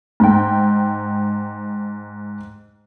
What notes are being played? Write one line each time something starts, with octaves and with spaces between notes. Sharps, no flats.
G#2 G5